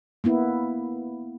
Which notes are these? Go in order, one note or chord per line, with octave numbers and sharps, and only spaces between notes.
A#3 B3 E4